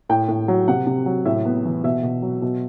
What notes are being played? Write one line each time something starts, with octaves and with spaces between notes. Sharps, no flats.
A2 G5
A2
F#3
C3 F#5
C3
F#3
A2 E5
B3
E3
B2 E5
B2
F#3
B2